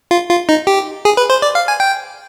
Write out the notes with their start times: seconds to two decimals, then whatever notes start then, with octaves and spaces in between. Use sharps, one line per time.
0.11 F4
0.29 F4
0.49 D#4
0.67 G4
1.05 G#4
1.17 B4
1.30 C5
1.42 D5
1.55 F5
1.68 G#5
1.80 G5